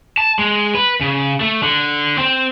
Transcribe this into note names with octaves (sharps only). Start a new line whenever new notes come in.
A5
G#3
B4
C#3
A3
D3
C4